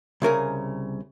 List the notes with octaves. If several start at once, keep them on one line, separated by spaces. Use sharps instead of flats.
C2 C#3 A#4 G#5